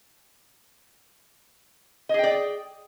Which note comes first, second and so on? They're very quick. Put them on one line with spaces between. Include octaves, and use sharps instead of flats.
D#5 G#4 G5 D5